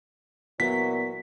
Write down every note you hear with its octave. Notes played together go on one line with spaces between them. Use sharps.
A#2 E3 F#3 B3 B6